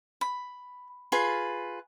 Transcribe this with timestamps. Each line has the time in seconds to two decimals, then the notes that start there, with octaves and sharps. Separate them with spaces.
0.21 B5
1.12 F4 G#4 B4 B5